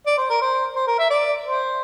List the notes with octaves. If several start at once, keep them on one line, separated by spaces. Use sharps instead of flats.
D5
C5
A#4
C5
C5
A#4
E5
D5
C5